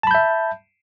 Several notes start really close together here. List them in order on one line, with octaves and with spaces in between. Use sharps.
A5 B5 G6 E5